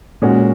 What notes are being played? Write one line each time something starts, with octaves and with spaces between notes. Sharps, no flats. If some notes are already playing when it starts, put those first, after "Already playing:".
A#2 G#3 C#4 F#4